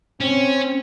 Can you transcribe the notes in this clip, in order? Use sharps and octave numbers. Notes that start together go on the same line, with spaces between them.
C4 C#4